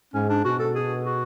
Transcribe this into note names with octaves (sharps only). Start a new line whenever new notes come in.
G#2 C#4
D4
B2 F#4
A4
G#4
F#4